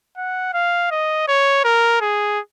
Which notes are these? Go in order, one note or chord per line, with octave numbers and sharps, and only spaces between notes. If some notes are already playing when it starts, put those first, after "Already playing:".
F#5
F5
D#5
C#5
A#4
G#4